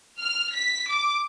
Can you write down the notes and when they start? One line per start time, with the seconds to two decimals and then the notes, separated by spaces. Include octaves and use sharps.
0.21 F6
0.54 B6
0.91 D6